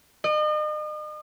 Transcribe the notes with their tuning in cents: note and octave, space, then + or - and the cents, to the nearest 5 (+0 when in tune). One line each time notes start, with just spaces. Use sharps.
D#5 -40